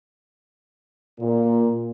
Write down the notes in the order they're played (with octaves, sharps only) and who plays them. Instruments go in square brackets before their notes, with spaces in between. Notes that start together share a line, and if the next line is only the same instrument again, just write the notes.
[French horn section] A#2